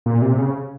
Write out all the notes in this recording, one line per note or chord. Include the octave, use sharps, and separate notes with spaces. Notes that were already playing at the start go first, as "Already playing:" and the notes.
A#2
C3
C#3